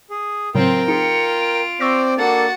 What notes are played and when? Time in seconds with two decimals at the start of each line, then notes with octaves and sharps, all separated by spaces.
0.10 G#4
0.55 A2 C#3 F#3 C4 F4 A#4 G5
0.88 D#4 F4 G#4 C#7
1.42 D7
1.80 C4 C5 D5 C#6 E6 A#6
2.18 A#3 D4 F#4 A4 F#5 A6